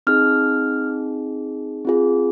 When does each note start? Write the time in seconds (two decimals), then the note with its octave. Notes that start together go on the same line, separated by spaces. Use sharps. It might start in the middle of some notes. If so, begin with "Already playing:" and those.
0.07 C4 D#4 G#4 F6
1.85 C4 F4 G#4